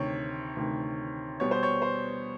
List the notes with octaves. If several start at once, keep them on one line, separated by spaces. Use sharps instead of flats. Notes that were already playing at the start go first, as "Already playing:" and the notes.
Already playing: D2 C3 D#3 C#5
D2 C3 D#3
B2 G3 B3 C#5
C5
C#5
C5